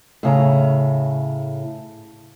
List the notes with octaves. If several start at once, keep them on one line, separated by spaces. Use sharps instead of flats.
A2 C#3 A#5